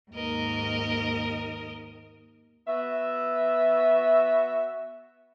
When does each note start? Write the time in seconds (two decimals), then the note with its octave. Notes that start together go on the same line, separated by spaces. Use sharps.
0.11 D#2 G#2 A#4 D#5
2.68 B3 F#4 E5